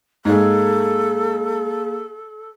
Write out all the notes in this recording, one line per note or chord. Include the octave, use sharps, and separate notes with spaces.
G#2 G#3 A#3 G#4 A4 F5